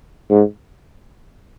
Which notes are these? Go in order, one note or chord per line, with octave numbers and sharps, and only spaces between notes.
G#2